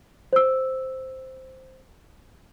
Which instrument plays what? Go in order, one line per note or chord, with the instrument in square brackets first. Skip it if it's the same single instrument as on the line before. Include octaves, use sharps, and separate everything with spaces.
[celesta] C5 E6